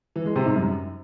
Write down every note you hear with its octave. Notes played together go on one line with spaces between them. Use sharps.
E3
G#3
C3
G#2
F#2